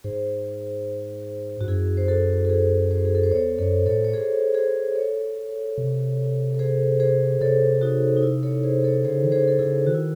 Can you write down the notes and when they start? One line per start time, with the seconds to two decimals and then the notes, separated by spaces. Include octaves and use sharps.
0.04 G#2 G#4 C5
1.61 G#2 F#4
1.67 F#2 E4 G#4
1.97 C5
2.08 F#4 A4
2.45 A4
2.49 G#4 C5
2.91 G#4 C5
3.05 G#4
3.15 A4
3.24 C5
3.31 E2 A4 C#5
3.58 F#2 A4 C#5
3.86 A2 A4 C#5
4.04 C#5
4.13 G#4 C5
4.54 G#4 C5
4.96 A4 C#5
5.78 C3
6.55 A4
6.59 G#4 C5
7.00 G#4 C5
7.41 C3 A4 C#5
7.82 D#4 F#4
8.16 D#4
8.23 E4
8.43 A4 C#5
8.64 G#4 C5
8.84 A4 C#5
9.05 C#3 G#4 C5
9.24 D#3
9.32 C#3 G#4 C5
9.48 A4
9.59 C#3 E4 G#4
9.87 D#3 F#4
9.94 E4